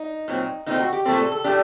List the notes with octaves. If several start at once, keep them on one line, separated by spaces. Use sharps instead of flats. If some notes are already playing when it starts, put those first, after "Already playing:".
Already playing: D#4
A#2 F#3 C4
A#2 A3 C4 D#4
F#4
G4
A#2 A3 C4 A4
A4
A4
A2 A3 D4 G4